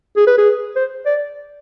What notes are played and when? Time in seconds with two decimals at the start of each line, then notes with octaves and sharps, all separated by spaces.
0.17 G#4
0.27 B4
0.38 G#4
0.76 C5
1.06 D5